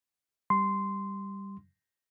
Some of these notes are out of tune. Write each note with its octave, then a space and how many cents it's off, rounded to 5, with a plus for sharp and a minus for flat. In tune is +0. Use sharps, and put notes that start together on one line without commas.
G3 +5 C6 -10